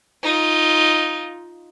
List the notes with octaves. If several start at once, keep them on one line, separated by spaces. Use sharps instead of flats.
D#4 F4